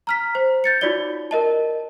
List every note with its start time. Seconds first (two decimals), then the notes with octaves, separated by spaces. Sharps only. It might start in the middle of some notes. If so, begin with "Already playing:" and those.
0.07 A#5 F6 B6
0.35 C5
0.64 G6 A6 C#7
0.81 D#4 F4 F#4 C#5 D5 G7
1.31 A#4 D#5 A5